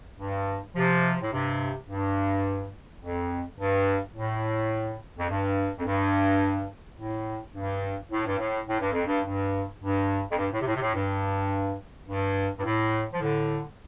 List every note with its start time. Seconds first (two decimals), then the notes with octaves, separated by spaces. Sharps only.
0.19 G2
0.76 C3 F3
1.22 A2
1.32 G2 C3
1.89 G2
3.02 F2
3.58 G2
4.16 A2
5.18 F2
5.29 G2
5.78 F2
5.85 G2
6.98 A2
7.55 G2
8.11 A2
8.26 G2
8.38 A2
8.68 A2
8.80 G2
8.93 F2
9.06 G2
9.25 G2
9.81 G2
10.30 F2
10.38 G2
10.52 A2
10.60 C3
10.66 A2
10.74 C3
10.81 A2
10.94 G2
12.08 G2
12.58 G2
12.64 A2
13.13 F3
13.21 A2 D3